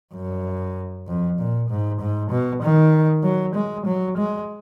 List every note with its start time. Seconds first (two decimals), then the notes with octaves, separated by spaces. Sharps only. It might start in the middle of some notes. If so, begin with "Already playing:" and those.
0.14 F#2
1.08 F2
1.39 A#2
1.70 G#2
2.01 G#2
2.31 B2
2.63 D#3
3.24 F#3
3.55 G#3
3.86 F#3
4.17 G#3